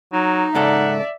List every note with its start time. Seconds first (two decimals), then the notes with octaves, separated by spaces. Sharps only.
0.13 F#3 D#4
0.55 G#2 C#3 A4 D5 E5 F#5